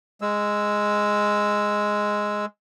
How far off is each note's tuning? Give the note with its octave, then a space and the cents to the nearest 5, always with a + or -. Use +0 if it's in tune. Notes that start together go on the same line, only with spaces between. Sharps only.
G#3 +0 E6 +0